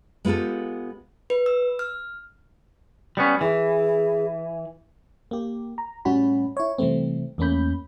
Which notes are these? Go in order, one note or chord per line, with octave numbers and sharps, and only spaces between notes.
G#3 B3 F4 G4 A4
B4
E6
F6
G3 B3 C#4
E3 G#4
A#3 G4
A#5
A2 G3 C#4 F#4 B5
E4 C#5
C3 E3 G3 A3 C4
E2 A3 A#3 C#4 B5 G6